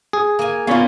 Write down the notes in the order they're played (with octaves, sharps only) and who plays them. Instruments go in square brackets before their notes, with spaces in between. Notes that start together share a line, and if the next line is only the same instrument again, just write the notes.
[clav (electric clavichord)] G#4
[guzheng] A#3 G#5
[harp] B3 C#5 [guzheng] C#4 D#4 [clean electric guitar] F4 D5 F5